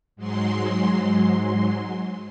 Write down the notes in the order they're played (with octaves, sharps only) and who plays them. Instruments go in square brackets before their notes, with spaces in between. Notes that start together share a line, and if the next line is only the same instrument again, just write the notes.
[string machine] G#2 F#3 G#3 C6